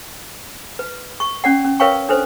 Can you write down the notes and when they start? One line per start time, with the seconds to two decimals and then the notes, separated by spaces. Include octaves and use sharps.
0.79 B4
1.20 C#6
1.44 C#4 D5 F#5
1.64 C#4
1.80 A#4 B4 C#5 F5 G5 C#6
2.09 D4 A4 B4 C5